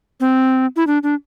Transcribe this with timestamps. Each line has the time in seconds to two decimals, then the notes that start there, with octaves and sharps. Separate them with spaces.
0.20 C4
0.76 E4
0.87 D4
1.03 D4